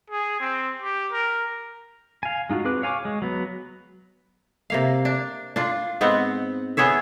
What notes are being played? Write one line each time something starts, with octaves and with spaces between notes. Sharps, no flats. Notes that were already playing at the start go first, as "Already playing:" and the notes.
G#4
C4
G4
A#4
F5 G#5
G#3 D#4 F4 F#4
C4 G#4 B4 D6 F#6
C#5 F5 G#5 C#6 D6
G#3
F#3 B3
C3 A#3 F5
D4
D4 F4
G#2 B3 C4 F#5
B3 G#4 C#5 E5